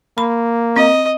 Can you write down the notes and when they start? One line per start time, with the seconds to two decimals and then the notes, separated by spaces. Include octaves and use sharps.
0.18 A#3 B5
0.76 C4 D#5